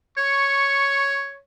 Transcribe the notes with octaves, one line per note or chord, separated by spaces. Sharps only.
C#5 C#6